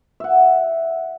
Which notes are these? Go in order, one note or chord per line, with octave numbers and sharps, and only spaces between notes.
E5 F#5